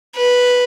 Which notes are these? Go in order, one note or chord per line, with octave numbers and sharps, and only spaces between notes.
B4